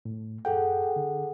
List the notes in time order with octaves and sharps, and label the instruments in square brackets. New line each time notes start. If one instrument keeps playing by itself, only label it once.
[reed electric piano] A2
[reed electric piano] F#2 G5 [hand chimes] G#4 A4 F#5
[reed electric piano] D3